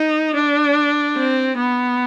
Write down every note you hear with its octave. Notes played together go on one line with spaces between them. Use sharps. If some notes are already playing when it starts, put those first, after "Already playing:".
Already playing: D#4
D4
C4
B3